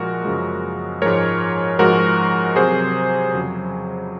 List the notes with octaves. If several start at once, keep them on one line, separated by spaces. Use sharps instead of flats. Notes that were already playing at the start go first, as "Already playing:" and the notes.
Already playing: A#2 F3 G#3 F#4 A#4
F#2 C#3 F3 G#3
G#2 F3 G#3 A#4 C#5
G#2 F3 G#3 F#4 A#4
C3 F#3 G#4 C5
F2 C#3 F#3